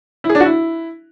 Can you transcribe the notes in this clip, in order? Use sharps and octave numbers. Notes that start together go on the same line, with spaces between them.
E4
G#4
D4
F#4
E4